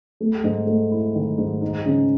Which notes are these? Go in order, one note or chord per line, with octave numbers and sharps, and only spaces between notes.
A3
G#2
A3
E4
D#3
G#2
D#4
C#3